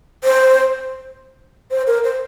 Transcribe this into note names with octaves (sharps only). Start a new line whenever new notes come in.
C5
C5
A#4
C5